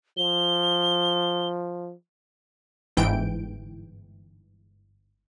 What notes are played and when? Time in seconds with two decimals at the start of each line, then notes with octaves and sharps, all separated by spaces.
0.17 F3 G7
2.97 G1 G#2 E3 G5 G6 D7